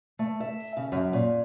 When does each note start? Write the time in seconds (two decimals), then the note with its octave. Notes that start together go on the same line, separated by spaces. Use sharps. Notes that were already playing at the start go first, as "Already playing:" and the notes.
0.19 A3
0.40 E5
0.77 C#3
0.92 F#2
1.13 A#2